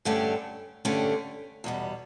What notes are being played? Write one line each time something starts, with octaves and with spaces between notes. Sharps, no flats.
G2 D3 A3 C#4 G4
G2 D3 A3 C#4 G4
E2 B2 G3